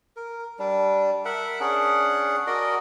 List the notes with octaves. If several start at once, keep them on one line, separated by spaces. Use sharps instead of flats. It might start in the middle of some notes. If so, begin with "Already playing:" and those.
A#4
G3 D4
A#4 E5 F#5
C#4 D4 G#4 F#5
F#4 A#4 D5 D#5